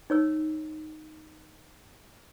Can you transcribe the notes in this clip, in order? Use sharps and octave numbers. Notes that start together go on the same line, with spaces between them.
D#4 C#5 E6